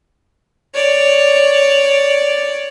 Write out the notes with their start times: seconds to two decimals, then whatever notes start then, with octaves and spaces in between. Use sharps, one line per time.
0.74 C#5 D5